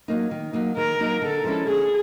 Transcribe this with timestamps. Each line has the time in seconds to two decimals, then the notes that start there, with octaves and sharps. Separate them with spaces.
0.08 F#3 A#3 D#4
0.31 D#3
0.53 F#3 A#3 D#4
0.77 D#3 A#4
0.99 F#3 A#3 D#4
1.22 D3 A4
1.44 F3 G#3 C#4 E4
1.66 D3 G#4